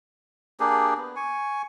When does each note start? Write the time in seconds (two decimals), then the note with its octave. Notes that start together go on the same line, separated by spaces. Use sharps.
0.60 A#3 D4 G4 G#4
0.97 B3
1.16 G#5 C#6